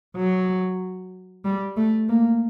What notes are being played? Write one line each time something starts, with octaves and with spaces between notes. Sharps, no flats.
F#3
G3
A3
A#3